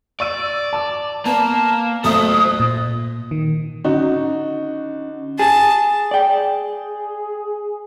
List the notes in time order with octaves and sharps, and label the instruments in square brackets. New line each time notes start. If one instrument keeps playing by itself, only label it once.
[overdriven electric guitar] D5 [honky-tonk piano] C#6 E6 D#7
[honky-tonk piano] A5 D6
[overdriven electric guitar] A#3 [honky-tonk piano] B3 [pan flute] A5
[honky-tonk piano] B1 A3 E5 [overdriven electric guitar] A4 C5 [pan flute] D#6
[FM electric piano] A#2
D#3
[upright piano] D3 D#4 F#4 [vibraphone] C#4
[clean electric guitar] G#4 [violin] A5
[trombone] G#4 [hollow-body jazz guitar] D5 G5